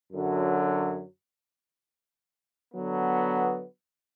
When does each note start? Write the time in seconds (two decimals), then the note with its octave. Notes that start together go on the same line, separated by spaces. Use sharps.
0.12 F#2 D3 F#3
2.74 D3 F#3 B3